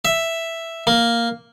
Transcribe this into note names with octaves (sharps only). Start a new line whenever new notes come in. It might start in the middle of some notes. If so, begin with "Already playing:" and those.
E5
A#3